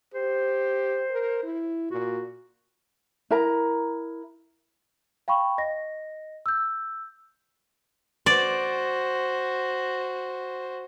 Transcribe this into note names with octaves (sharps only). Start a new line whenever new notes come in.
G4 C5
A#4
E4
A#2 F#4
E4 A#4 A#5
F5 G5 B5 C#6
D#5 A#6
E6 G6
F#4 C5 D5